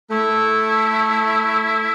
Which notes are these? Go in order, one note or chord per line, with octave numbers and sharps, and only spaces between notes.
A3 E4